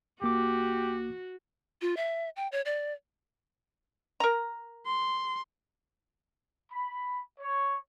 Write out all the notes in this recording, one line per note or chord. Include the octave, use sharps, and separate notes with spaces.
C2 A#3 F#4 G4 D6
F4
E5
G5
C#5
D5
A#4 A#5
C6
B5
C#5